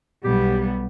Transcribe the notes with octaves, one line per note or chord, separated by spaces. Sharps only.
B1 G3 B3 G4